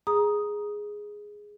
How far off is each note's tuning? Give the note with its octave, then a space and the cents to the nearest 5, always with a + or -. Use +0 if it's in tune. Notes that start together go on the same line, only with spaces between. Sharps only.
G#4 +0 A#5 +20 D#6 +0